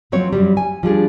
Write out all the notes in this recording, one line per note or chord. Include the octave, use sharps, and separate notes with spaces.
F3 F#3 C4 C#5
F#2 F#3 G3
G#5
F3 G3 D4 G#4